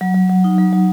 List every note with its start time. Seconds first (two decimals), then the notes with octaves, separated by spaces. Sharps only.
0.01 F#3
0.15 F#3
0.30 F#3
0.44 D#4
0.58 F#3
0.73 F#3